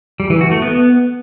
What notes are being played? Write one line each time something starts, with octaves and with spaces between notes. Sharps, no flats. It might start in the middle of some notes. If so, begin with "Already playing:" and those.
G3
E3
F#4
A3
B3